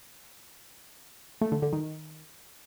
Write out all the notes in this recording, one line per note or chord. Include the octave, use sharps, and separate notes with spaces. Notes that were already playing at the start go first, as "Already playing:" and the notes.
A3
D3
D3
D#3